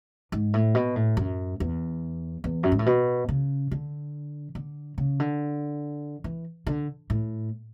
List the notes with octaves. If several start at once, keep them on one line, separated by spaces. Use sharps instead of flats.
G#2
A2
B2
A2
F#2
E2
E2
F#2
G#2
A2
B2
C#3
D3
D3
C#3
D3
E3
D3
A2